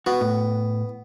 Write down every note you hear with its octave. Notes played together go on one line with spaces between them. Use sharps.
B3 F#4
A2